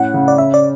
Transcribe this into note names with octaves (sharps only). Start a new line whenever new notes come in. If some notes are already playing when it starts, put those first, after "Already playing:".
Already playing: A2 C#4 F#5
C#3
D5
C#4 E5
D5